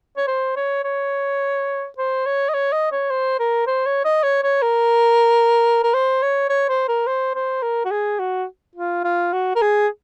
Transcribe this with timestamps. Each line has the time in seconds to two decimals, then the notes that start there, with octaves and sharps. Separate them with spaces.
0.17 C#5
0.28 C5
0.57 C#5
0.84 C#5
1.98 C5
2.26 C#5
2.49 D#5
2.54 C#5
2.73 D#5
2.92 C#5
3.10 C5
3.40 A#4
3.67 C5
3.86 C#5
4.05 D#5
4.23 C#5
4.43 C#5
4.62 A#4
5.84 A#4
5.94 C5
6.23 C#5
6.50 C#5
6.69 C5
6.88 A#4
7.07 C5
7.35 C5
7.63 A#4
7.85 F#4
7.91 G#4
8.19 F#4
8.76 F4
9.04 F4
9.33 F#4
9.56 A#4
9.62 G#4